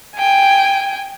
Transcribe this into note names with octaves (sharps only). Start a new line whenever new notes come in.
G5 G#5